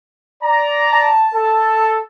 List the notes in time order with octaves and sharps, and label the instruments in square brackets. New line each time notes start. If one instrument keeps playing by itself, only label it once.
[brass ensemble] D5 A#5
[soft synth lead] A5
[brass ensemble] A4